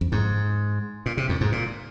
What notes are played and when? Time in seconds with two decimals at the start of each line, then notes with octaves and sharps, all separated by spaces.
0.01 F2
0.12 G#2
1.06 A#2
1.17 C3
1.29 F2
1.41 G#2
1.52 A#2